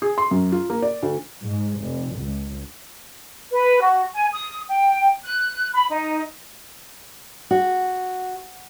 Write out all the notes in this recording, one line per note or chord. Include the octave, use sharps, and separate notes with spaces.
G#4
C6
F#2
F4
A#3
D5
D2
G#2
F1
C#2
B4
F#4
G#5
D#6
G5
F#6
B5
D#4
F#4